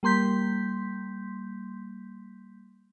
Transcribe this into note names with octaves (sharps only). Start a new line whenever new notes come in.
G3 A#3 C6 G6 B6